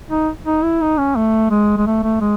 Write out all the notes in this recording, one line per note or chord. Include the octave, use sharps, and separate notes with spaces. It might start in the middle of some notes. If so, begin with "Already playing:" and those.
D#4
D#4
E4
D#4
C#4
A3
G#3
G#3
A3
A3
G#3